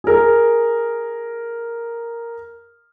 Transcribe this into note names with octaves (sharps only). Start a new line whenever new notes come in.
G#4 A#4